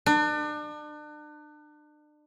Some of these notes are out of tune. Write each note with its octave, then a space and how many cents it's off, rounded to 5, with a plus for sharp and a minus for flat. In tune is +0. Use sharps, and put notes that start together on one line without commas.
D4 +35